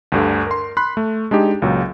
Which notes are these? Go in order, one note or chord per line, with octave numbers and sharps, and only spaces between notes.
D2 G2 D3
A#4 C6
B5 C6 F#6
A3
G#3 D4 D#4 G4
C#2 A#2 F#3